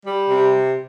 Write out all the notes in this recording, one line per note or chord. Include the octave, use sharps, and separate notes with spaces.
G3
C3